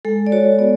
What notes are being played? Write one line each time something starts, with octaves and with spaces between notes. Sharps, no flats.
G#3 A4
D5
F#4 C#5
B3 D5